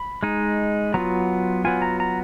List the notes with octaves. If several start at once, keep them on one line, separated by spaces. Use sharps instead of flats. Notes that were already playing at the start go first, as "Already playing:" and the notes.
Already playing: B5
G#3 D#4
F#3 B3 F4 A#5
F#3 B3 F4 G#5
A#5
A#5